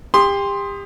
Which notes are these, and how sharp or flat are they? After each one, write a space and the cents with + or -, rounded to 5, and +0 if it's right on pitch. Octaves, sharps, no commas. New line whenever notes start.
G4 +30 C6 +0 D#6 +0